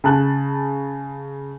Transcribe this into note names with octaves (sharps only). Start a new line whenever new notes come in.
C#3 A5 F#6